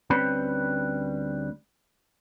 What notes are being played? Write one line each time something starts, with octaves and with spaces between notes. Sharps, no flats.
D2 G3 C4 C#4 B4 B5